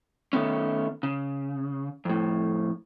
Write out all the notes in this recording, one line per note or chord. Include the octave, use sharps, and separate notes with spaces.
D#3 A3 B3 C#4
C#3
F2 A2